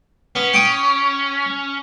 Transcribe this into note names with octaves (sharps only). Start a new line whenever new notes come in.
B3 C#4
G5 D6 D#6